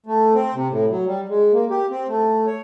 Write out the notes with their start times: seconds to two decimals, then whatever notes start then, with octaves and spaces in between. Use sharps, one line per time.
0.06 A3
0.34 C4
0.54 C3
0.70 A2
0.90 F#3
1.06 G3
1.29 G#3
1.53 A#3
1.70 G4
1.90 C4
2.08 A3
2.46 C#5